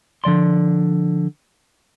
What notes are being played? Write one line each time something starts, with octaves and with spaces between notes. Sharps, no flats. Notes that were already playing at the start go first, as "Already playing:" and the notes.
D3 F3 D5 C6